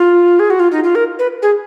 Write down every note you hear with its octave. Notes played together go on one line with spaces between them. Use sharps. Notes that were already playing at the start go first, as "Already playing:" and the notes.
Already playing: F4
G#4
F#4
F4
D#4
F4
A#4
B4
G#4